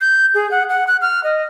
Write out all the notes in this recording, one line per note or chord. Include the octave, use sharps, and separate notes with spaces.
G6
G#4
F#5
F#5
F#6
F6
D#5